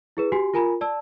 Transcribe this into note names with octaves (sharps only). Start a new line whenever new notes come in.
E4 G#4 B4
F#4 G4 G#5 C6
F4 A#4 G#5 A#5 B5
D5 A5 E6